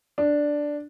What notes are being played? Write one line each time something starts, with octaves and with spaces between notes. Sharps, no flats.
D4